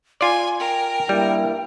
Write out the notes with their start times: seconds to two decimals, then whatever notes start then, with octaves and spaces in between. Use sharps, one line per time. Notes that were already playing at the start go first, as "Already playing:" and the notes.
0.21 F4 D5 G#5 C6
0.59 A#4 G5
1.09 G2 G3 A#3 E4